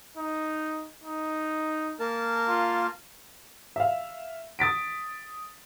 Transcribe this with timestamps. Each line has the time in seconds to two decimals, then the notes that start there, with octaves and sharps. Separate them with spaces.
0.17 D#4
1.04 D#4
2.00 A#3 A#4 A5
2.49 F4
3.76 E5 F5
4.59 D#6 A6 B6 D7